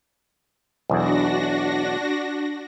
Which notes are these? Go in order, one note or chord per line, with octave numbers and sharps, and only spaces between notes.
B1 E2 D4 F#4 A#6